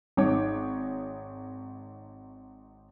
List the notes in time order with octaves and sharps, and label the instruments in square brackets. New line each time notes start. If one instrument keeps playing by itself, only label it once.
[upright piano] G#1 D#4 C#5 D6